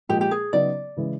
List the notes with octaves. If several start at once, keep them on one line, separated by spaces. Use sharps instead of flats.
A#2 F3 G#3 G4
G4
G#4
C#3 F#3 B3 D#4 D5
C#3 E3 G#3